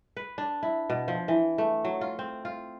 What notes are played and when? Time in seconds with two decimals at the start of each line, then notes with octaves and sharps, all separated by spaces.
0.17 B4
0.38 D4
0.63 E4
0.90 B2
1.08 F3
1.28 E3
1.58 A3
1.85 F#3
2.01 F4
2.19 C4
2.45 F4